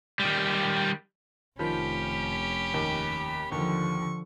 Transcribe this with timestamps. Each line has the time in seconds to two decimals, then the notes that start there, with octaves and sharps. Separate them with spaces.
0.20 D#3 G3
1.59 F1 D#3 F3 C#4 G4 B5
2.74 D#2
3.52 D#2 D3 F3 C#6